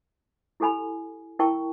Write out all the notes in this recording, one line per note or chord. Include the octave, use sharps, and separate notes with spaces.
E4 G4 A4 G#5 B5
E4 A#4 G5 A5 C#6